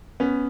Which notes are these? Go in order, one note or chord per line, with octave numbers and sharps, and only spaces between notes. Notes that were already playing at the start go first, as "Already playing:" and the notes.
B3 C#4